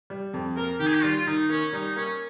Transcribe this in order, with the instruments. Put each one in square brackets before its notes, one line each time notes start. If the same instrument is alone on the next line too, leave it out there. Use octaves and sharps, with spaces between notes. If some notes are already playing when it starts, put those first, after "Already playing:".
[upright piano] G3
F2
[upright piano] A#3 [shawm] A#4
[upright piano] D#3 [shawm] G4
[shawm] G#4
G4
[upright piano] G3 [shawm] F4
[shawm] F4
[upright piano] D#3 [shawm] D#4
[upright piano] A#3 [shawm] C#4
[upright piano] G3 [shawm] D#4
[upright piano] A#3 [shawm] C#4